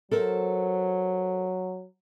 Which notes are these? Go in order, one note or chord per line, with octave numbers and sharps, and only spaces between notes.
F#3 A4 A#4 C5